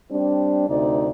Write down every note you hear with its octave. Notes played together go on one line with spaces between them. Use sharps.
G3 C4 D4
D2 C3 D#4 D5